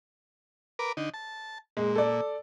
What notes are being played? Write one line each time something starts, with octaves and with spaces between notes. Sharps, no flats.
A#4 B4 D6
D3 D#4
A5
A#2 G#3
A4 D5